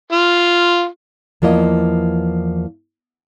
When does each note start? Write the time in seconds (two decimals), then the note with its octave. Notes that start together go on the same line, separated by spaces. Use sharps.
0.12 F4
1.42 E2 F3 A#3 E4 D#5